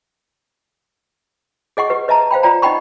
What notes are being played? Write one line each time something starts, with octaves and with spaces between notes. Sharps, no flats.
G#4 D#5 F#5 C#6
G4 B4
B4 D#5 E5 A5 A#5
C5 F5 G5 B5
F4 D5 G5 A#5
D#4 D#5 F#5 G5 B5 C#6